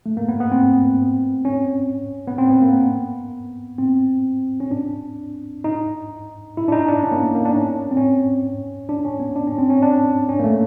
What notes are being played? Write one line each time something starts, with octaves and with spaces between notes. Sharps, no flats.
A3
A#3
B3
B3
C4
C#4
B3
C4
B3
A#3
B3
C4
C#4
D4
D#4
E4
D4
D#4
D4
C#4
A#3
B3
A#3
D4
C#4
C4
C#4
D4
C#4
B3
D4
C#4
C4
C#4
D4
C#4
A#3
A3